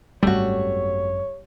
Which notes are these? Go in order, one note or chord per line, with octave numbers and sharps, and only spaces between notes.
G#1 F#2 G3 A3 F#4 C#5